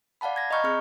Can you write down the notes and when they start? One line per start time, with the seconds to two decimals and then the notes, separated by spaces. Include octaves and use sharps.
0.21 D5 F5 F#5 A5 B5
0.36 G#6 A#6
0.51 D#5 A#5 B5 C#6 F6 G6
0.64 C4 G#4 F6